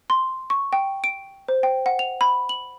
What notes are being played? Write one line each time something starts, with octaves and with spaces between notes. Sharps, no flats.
C6
C#6
G5
D7
C5
G5
F#5
F7
B5
F#7